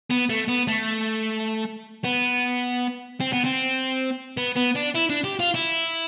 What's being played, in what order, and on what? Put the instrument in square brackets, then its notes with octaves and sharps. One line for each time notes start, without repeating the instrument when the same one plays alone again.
[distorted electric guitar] B3
A3
B3
A3
B3
C4
B3
C4
B3
B3
D4
E4
D4
G4
F4
E4